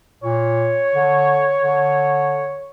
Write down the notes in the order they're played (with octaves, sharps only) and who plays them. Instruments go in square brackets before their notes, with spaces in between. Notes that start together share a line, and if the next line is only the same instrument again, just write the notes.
[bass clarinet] A#2 [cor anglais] C#5
[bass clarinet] D3
D3